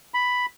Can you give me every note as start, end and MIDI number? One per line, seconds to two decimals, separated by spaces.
0.14 0.46 83